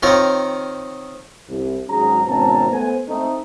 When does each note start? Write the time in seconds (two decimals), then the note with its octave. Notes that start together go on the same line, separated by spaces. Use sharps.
0.03 D#3 C4 F4 A#4 C#5
1.48 C2
1.88 G#1 G#2 F#3 C#4 G#4 A#5
2.26 G#1 B2 C4 C#4 A5 A#5
2.72 A3 B3 C5 G#5
3.09 A3 C4 D#4